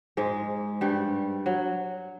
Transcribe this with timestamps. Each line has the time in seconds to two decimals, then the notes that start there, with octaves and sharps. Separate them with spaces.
0.17 G#2 G#3
0.81 G2 G3
1.46 F#3